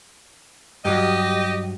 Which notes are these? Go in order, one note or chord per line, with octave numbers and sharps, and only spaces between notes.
G2 F#3 G4 D#5